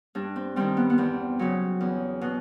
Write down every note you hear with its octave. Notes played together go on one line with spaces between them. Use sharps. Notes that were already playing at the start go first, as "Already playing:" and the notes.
G2 D4
C4
D#3 G3 C4
B3
B3
E2 C4
C#3 F#3
E2
B2